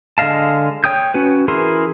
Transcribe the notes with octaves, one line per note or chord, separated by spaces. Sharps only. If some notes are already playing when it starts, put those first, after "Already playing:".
D3 G#3 D#5 F5 A5
C#5 G5 D#6 G6
C#4 F#4 B4
E3 E4 G#4 A#4 C6